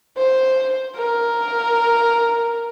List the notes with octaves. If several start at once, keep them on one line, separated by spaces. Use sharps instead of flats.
C5
A#4